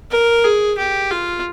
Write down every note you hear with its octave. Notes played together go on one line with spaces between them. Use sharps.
A#4
G#4
G4
F4